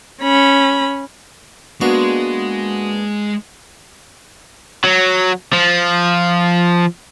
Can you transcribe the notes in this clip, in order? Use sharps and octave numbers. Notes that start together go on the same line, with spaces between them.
C#4 B5
G#3 A#3 B3 D4 F#4
F#3
F3